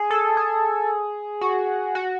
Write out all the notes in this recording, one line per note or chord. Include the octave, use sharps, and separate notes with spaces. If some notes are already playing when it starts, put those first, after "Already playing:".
Already playing: G#4
A4
G#4
F#4
F#4